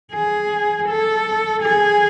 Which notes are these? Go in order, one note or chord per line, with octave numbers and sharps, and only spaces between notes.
G#4
A4
G#4